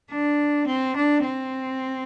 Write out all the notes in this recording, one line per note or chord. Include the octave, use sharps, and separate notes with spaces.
D4
C4
D4
C4